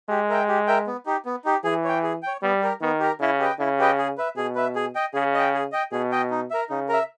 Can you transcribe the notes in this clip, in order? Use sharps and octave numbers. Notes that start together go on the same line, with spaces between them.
G#3 G4
A#4 E5 G5
G4
A#4 E5 G5
B3
D#4 G4
B3
D#4 G4
E3 G#4
C#5 G5
G#4
C#5 G5
G3 B3
G4 A#4
D#3 B3
G4 A#4
C#3 E4
G4 B4 D#5 G5
C#3 E4
G4 B4 D#5 G5
G#4
B4 E5
B2 G#4
B4 E5
G#4
D#5 G5
C#3 G#4
D#5 G5
G#4
D#5 G5
B2 G#4
D#5 G5
D#4
A#4 E5
C#3 D#4
A#4 E5